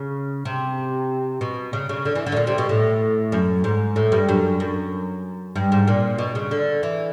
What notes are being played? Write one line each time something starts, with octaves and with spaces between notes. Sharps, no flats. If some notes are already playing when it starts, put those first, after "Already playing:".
Already playing: C#3
C3
B2
C#3
C#3
D3
E3
D3
A2
A#2
C3
B2
A2
F#2
G#2
A2
G2
F#2
F#2
G2
G#2
A#2
B2
C#3
D3
E3